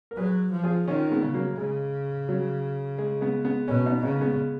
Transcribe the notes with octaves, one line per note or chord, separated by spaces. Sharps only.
A#4
F#3 G#4 B4
F3
F4 G#4
D#3 C#4 F4
G#3 B3
C#3
F#3 A#3
C#3 G#3
F#3
G#3
G#3 B3
G#3 B3
B2 A#3 C#4
B3 D#4
C#3 B3 D#4
G#3 B3